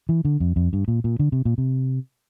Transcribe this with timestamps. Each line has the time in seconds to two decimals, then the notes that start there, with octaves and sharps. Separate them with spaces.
0.09 E3
0.25 D3
0.40 F2
0.56 F2
0.73 G2
0.88 A#2
1.04 A#2
1.19 D3
1.32 C3
1.45 A#2
1.58 C3